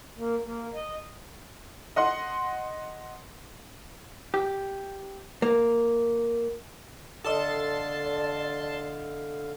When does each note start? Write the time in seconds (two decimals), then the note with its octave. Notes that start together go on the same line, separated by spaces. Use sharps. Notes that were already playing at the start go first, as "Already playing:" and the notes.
0.18 A#3
0.45 A#3
0.74 D#5
1.96 D#5 F#5 C6
4.34 G4
5.42 A#3
7.24 D3 A4 D5 D#5 F5 A5 C6 D#6